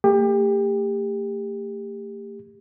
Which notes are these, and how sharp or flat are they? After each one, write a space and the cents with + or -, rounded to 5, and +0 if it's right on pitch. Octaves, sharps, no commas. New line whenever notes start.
A3 +45 G4 +30